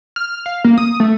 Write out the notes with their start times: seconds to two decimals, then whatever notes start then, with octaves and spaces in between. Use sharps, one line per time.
0.16 F6
0.46 F5
0.65 A#3
0.78 D#6
1.00 A3